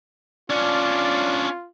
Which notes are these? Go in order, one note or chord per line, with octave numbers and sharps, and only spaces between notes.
C#4 D4 F4 D5